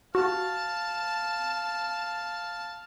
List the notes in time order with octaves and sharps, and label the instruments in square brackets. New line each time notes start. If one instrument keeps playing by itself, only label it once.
[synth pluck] F#4 [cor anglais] F5 [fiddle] A5